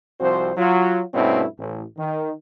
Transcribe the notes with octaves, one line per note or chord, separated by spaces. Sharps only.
C2 F3 C4 F#4 C5
F#3 F4
G2 B2 A3 C4 C#4 E4
A1
D#3